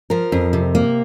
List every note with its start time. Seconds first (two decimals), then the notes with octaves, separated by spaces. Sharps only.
0.10 F3 A#4
0.32 F2
0.53 C3
0.75 A#3